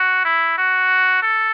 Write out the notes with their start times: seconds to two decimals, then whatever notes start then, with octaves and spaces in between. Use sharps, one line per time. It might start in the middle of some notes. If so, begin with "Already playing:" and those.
Already playing: F#4
0.25 E4
0.58 F#4
1.22 A4